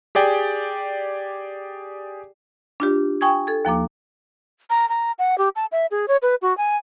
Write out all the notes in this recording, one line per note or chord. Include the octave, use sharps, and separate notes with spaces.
G4 G#4 D5 G5
D4 F4 G4
G5 G#5 C#6 D#6 G#6
A4 G#6
D#2 F3 A#3 D6
A#5
A#5
F#5
G4
A5
E5
G#4
C#5
B4
F#4
G#5